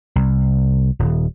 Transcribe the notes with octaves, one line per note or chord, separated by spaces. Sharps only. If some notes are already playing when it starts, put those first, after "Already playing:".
C2
D#1